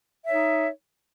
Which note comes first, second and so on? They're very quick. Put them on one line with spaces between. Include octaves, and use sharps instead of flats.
E5 C#5 D#4